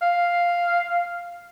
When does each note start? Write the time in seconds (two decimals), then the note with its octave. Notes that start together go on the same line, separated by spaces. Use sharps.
0.02 F5